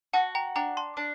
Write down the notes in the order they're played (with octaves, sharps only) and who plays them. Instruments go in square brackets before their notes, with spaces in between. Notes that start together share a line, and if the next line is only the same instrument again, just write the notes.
[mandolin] F#4 [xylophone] F#5 A5
[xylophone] G5 A#5
[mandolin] D4 [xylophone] G5 A#5
[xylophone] A5 C6
[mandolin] D4